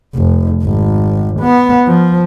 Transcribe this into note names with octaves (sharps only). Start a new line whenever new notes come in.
F1
G#1
B3
F3